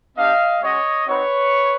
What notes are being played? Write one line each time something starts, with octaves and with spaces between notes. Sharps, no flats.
B3 D4 G4 D#5 F5
G#3 C#4 F#4 C#5 D#5
C4 D#4 F#4 B4 C#5